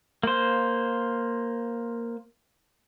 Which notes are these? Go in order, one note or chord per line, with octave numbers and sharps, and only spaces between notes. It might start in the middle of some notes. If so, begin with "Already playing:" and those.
A#3 C5